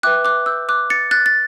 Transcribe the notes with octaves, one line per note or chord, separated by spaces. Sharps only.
B4 E5 G5 D6 F#6
D6 F#6
E6 G6
D6 F#6
A6 C#7
F#6 A6
A6